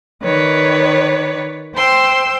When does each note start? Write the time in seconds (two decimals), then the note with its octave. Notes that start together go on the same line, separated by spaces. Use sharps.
0.23 D#3 B4 C#5 D5
1.76 C5 G5 C6 E6